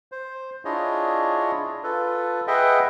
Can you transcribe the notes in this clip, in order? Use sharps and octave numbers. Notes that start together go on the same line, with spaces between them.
C5
D4 E4 F4 G#4 C#5 D#5
F4 A4 B4
G#4 B4 D#5 E5 F#5 G5